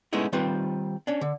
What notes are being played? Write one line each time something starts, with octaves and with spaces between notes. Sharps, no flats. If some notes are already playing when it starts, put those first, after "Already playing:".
G#3 A3 B3 C#4 D#4 E4
D#3 G3 C4 F4 B4
C#4 D4
D3